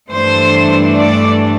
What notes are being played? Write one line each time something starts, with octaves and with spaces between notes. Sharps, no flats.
G2 E3 A3 D4 C5
D5